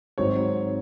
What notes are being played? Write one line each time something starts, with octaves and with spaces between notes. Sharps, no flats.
G#1 G#2 F#3 C4 D#4 C#5